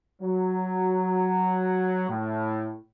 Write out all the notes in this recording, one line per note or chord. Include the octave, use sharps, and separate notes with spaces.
F#3
A2